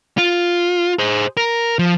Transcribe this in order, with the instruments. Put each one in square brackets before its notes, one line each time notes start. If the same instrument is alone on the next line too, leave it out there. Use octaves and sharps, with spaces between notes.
[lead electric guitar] F4
G#4 C5
A#4
F3